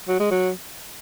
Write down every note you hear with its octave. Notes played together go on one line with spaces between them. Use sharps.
F#3
G#3
F#3